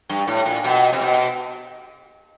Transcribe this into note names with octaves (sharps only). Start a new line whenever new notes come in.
G2
A2
A#2
B2
C3
B2